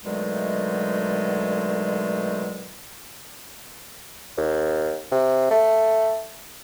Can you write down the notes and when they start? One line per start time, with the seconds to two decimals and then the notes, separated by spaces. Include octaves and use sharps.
0.05 B2 D3 D#3 F#3 G#3 A3
4.38 D#2
5.12 C3
5.51 A3